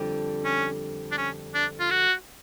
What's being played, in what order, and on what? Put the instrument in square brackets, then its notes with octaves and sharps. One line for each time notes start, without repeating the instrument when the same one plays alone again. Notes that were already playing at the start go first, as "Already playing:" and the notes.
Already playing: [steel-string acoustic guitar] F2 D3 G3
[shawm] C#4
D4
C#4
D4
F4
F#4